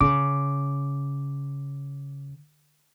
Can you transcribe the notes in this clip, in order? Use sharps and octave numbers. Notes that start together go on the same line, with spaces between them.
C#3 D6